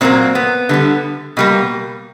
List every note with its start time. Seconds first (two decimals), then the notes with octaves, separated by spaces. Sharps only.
0.01 A#2 F#3 A#3 C4
0.35 B3
0.69 D3 G3 B3
1.37 B2 G3 A#3